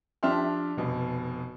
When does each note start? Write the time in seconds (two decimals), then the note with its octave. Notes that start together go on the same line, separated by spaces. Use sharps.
0.23 F3 D4 G4 E5 C6 F6
0.77 F1 B2